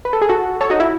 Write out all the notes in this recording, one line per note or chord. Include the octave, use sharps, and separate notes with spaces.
B4
A4
G#4
F#4 A4
A4 C#5
D#4 F#4
E4